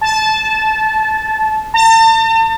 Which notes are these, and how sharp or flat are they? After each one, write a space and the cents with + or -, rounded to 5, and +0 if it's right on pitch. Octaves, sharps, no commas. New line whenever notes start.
A5 -20
A5 +40